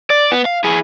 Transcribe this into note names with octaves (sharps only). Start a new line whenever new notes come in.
D5
B3
F5
E4 G#4